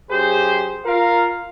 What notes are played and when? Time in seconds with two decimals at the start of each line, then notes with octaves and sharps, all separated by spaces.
0.10 F#2 G4 G#4 C5
0.85 F4 A#4 F5